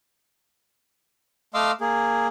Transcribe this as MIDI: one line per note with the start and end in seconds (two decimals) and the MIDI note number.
1.54 1.72 57
1.54 1.72 75
1.54 1.72 77
1.54 1.72 84
1.54 1.72 86
1.54 1.72 88
1.81 2.27 58
1.81 2.27 68